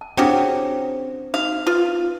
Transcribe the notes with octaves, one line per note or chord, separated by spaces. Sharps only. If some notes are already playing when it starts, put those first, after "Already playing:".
A5
C#3 C4 D4 E4 F#4 G4 G5
D#4 F#4 F5
F4 B4